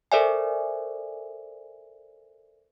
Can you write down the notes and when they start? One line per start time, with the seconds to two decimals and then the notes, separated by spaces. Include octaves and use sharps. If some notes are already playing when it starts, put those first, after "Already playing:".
0.12 A4 A#4 C5 D5 E5 G#5